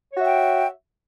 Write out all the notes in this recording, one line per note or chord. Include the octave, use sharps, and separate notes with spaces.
F#4 C#5 E5 G5